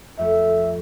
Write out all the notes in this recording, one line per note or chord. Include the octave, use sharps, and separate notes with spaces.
F2 A3 E5